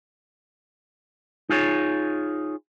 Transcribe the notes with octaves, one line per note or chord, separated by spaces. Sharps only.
D#4 F4 G#4 C#5